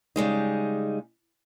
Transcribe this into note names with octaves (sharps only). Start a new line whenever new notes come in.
C#3 G3 G#3 D#4